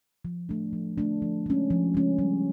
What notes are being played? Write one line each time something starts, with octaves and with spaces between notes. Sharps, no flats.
F3
A3 D4
F3
A3 D4
F3
G#3 C#4
F3
G#3 C#4
G3